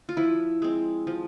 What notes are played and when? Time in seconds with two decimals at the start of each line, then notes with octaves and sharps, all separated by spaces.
0.09 F4
0.17 F3 E4
0.62 G#3 C4
1.07 F3